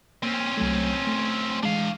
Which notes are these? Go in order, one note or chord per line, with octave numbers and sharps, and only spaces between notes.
A#3 C4 C#4
C2 F#3 A3
A3
E3 G#3 D4 F5